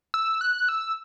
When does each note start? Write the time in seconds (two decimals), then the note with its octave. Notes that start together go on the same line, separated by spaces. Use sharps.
0.14 E6
0.41 F#6
0.69 E6